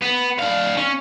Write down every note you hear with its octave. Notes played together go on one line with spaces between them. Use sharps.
B3
D4 F5
C#4